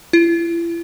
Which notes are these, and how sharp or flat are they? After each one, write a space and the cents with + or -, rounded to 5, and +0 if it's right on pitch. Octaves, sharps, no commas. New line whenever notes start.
E4 +35